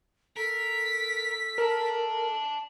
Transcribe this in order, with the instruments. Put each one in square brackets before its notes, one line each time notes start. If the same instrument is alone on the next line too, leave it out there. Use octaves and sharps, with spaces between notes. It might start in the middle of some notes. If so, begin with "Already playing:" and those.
[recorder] A4 [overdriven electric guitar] A#4 [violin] B6
[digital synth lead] A#4 [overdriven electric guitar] D5 A5